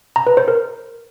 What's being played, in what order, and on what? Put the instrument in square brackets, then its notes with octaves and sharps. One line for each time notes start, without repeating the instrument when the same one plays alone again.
[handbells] A#5
B4
C5
A#4